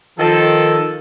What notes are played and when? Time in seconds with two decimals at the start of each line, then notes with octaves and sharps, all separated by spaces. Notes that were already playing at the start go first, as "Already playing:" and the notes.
0.18 D#3 F3 A4